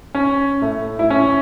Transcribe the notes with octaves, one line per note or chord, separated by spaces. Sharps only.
C#4
A2 A3
E4
C#4